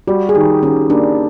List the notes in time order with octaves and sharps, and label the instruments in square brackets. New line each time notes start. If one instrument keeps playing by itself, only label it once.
[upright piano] G3 [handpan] F#4
[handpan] G#4
[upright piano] D#3 [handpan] G4
[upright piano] D#3 [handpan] C#4
[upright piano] A#3 [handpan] D4